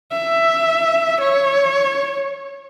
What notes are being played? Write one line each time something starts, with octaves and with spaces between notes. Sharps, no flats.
E5
C#5